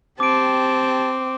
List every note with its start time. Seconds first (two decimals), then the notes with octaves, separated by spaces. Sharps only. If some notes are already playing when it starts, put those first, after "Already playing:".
0.20 C4 G4 A5 D6 D7